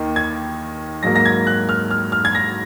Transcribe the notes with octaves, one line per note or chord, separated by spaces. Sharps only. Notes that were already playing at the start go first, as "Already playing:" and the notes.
Already playing: D#2 D#3 A#3
G#6
G#2 F#3 A#3 A#6
A#6
G#6
F#6
F6
F6
F6
G#6
A#6